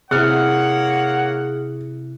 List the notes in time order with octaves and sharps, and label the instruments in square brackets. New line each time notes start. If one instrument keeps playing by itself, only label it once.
[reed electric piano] C3 E4 [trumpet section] A#3 C#5 F#5 [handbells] G#4 F6 [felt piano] F#6